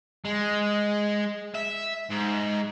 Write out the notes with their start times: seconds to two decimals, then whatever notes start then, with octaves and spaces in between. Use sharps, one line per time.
0.25 G#3
1.55 E5
2.10 G#2